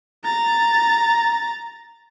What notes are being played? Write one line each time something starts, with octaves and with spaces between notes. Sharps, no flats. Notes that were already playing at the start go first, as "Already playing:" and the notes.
A#5 A6